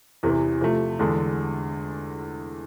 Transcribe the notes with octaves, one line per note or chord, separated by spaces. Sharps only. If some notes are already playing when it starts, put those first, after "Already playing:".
E2 C3 E3
C3 F3 A3
E2 D3 G#3 D4